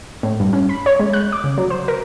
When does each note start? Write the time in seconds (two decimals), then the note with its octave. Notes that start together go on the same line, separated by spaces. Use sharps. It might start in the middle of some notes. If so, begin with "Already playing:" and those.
0.23 A2
0.40 G2
0.53 C#4
0.69 B5
0.86 C#5
1.00 G#3
1.13 F#6
1.32 D6
1.44 C#3
1.58 F#3
1.70 C5
1.88 A#4